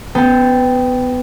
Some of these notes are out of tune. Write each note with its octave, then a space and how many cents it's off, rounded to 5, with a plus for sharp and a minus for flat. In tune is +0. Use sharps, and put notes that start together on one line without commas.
B3 +20 A4 +0 G5 +0